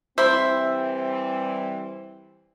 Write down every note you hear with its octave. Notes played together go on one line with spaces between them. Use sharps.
E3 G3 C4 E4 C5 E5